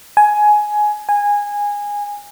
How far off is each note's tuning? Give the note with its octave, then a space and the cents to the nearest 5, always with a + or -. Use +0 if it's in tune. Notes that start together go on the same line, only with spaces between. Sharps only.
G#5 +15
G#5 -15